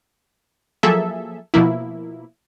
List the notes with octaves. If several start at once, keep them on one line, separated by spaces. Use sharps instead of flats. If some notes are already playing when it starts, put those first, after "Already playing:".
F3 F#3 A#3 G#4 A4 E5
B2 F3 A#3 E4